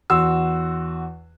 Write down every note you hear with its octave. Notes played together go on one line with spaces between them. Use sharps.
E2 F#4 C6 E6